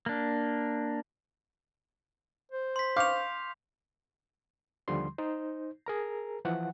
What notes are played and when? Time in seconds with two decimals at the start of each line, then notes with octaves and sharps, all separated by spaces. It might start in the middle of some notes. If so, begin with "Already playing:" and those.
0.06 A#3 D4
2.52 C5
2.76 C6 B6
2.96 F5 C#6 D6 G6 F7
4.88 D#2 D3 F3 G3 C6
5.18 D#4 C5
5.86 G#4 A#4 A#5
6.45 E3 F3 F#5